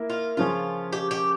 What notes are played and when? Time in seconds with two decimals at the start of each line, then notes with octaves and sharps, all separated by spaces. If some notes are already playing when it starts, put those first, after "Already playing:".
Already playing: A#3 E4 A#4
0.10 F4
0.37 C#3 F3 C#4 F4
0.93 G4
1.11 G4